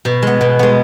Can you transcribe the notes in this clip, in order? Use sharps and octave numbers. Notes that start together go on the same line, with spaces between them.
B2
G#3 B3
B2
G#3 B3